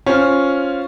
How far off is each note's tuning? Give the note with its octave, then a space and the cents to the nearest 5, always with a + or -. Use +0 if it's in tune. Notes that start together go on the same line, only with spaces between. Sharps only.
C#4 +0 F4 +0 C5 +5